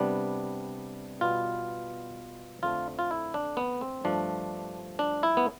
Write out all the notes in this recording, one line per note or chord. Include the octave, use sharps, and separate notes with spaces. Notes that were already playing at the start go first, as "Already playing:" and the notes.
Already playing: C3 G3 B3 D4
B2 G3 B3 F4
F2 D3 F3 A3 F4
F4
E4
D4
B3
C4
G2 F3 A3 D4
D4
E4
B3